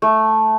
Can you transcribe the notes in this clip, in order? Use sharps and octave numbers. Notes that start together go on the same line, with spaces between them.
A3